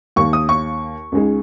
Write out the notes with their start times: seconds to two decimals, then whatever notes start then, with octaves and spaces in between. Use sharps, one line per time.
0.16 D#2 D#3 A#3 C#6
0.33 D#6
0.49 C#6
1.12 C#2 C#3 G#3 D#4